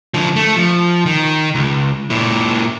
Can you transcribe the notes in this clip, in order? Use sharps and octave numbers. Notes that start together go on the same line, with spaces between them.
D3 F3
A3
F3
D#3
C#2
A#2 E4